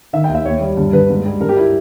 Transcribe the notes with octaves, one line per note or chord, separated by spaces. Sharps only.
D#3 E5
G5
D#2
E5
D#2 C#5
G3
G2
G2 B4
G#2
G3
G2 A#4
G4
E4